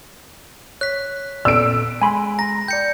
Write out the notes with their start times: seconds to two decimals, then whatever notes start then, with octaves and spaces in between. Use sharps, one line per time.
0.81 C#5 F#6 B6
1.45 A#2 B3 A4 D5 E6 D7
2.01 G#3 G#5 B5 C6
2.39 A#5 A#6
2.68 D5 G5 G6 C#7